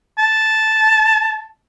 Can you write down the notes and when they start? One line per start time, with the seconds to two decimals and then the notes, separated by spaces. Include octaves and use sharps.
0.18 A5